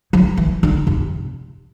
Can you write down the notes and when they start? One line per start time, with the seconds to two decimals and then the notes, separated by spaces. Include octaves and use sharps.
0.13 F#3
0.37 E3
0.63 D3
0.87 C3